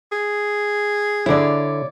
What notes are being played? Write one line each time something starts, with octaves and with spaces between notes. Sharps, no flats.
G#4
D3 E4 C#5 D5